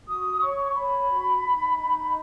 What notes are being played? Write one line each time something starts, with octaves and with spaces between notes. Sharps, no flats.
F#4 D#6
C#5 C#6
C#5 B5
F#4
D#4
D#4